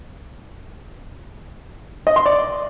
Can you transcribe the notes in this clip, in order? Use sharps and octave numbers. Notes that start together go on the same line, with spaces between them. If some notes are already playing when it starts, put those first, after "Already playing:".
D#5
C6
D5